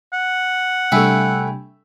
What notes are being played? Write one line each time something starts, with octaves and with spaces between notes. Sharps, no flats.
F#5
C3 G3 A3 D4 E5 G5 G#5 B5